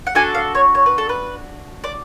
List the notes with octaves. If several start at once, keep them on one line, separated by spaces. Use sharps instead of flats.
F#5
D4 F#4 A4 G#5
F5
C#5
C#5
B4
A4
B4
D5